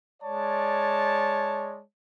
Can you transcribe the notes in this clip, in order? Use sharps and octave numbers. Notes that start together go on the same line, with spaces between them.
G#3 C#5 D5 A5